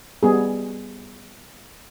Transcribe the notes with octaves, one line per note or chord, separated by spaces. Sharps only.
G3 B3 G#4